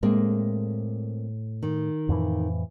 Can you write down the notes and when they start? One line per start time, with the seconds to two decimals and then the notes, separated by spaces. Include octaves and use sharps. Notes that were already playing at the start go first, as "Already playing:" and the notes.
0.03 A2 G#3 A#3 C4
1.63 D#3
2.09 F2 A2 E3